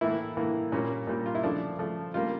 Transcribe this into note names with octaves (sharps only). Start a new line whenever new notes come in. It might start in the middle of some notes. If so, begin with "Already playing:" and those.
A2 E3 A#3 E4
A2 E3 A#3
A#2 G3 A#3 C#4
A#2 G3 A#3
F4
E4
C#3 F3 A3 D4
C#3 F3 A3
C#3 G3 A#3 F4